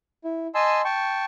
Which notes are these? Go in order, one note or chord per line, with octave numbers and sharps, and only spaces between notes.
E4
D#5 G#5 A5 C6 E6
G5 A5 C#6